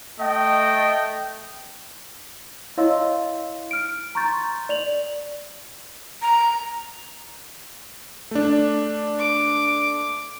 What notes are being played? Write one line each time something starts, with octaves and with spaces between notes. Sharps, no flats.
A3 D#5 G5
E4 C#5 D#5 F5 C6 E6
F6 D7
A#5 C6 C#6 G6 A6
D5 F7 F#7
A#5
A3 D4
D6